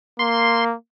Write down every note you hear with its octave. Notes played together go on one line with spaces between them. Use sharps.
A#3 C6